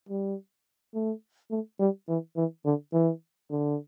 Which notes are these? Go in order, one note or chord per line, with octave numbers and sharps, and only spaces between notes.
G3
A3
A3
G3
E3
E3
D3
E3
D3